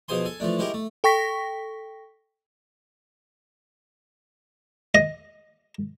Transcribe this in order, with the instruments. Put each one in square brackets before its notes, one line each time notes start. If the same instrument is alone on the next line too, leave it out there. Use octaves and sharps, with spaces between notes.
[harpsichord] B2 F3 G#4 C5 G#5 C6
A4 G#5
E3 F3 A3 D4
G#3 C#4 E4 G4 A#4
A3
[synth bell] A4 G5 C#6 A#6 B6
[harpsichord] D#5